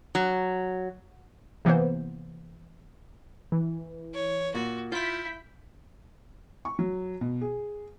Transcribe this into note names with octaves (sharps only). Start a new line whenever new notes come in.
F#3
C3 E3 A#3 B3 C5
E3
C#5
A#2 F#4
E4 F4 G6 B6
C#6
F#3
B2
G#4